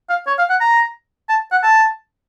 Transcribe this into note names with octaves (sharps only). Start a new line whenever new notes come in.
F5
C#5
F5
F#5
A#5
A5
F#5
A5